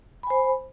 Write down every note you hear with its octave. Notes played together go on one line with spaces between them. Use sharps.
C5 G#5 B5